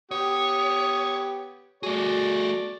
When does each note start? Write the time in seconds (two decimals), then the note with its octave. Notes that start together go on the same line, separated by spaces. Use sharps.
0.11 B3 G4 C#5 D#6
1.83 A3 F#4 G#4 D5